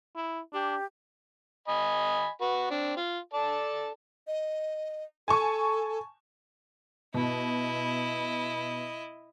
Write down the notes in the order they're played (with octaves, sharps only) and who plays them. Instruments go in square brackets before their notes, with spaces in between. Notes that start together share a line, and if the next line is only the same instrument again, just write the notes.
[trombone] E4
[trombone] D4 [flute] G4
[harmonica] D#5 G#5 B5
F#4 B4
C4 D4
F4
A4 D5 A5
[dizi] D#5
[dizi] A4 [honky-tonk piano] G#5 A5 C#6
[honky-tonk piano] B2 [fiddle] E4 D#5